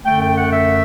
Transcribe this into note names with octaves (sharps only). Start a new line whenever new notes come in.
F#2 D3 A3 G5
G5
F#5
E5